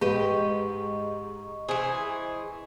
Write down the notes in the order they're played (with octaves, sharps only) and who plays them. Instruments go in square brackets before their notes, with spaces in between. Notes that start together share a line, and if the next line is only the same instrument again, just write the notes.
[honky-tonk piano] G#2 [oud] G4 B4 [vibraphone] D#5 C#6
[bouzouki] E3 G#4 [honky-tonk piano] C5